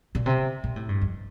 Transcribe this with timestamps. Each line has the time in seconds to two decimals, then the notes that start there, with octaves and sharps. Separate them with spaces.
0.15 A#2
0.26 C3
0.64 A#2
0.76 A2
0.89 G2
1.02 F2